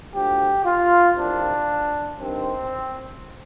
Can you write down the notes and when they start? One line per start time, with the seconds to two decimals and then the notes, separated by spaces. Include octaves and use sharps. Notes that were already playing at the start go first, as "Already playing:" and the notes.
0.13 D2 D3 F3 G4
0.65 F4
1.16 C2 C3 D#3 D4
2.18 G2 D#3 C4